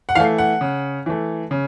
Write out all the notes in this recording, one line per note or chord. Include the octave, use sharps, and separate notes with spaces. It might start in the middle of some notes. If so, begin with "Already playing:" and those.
F#5
E3 A3 F5
F#5
C#3
E3 A3
C#3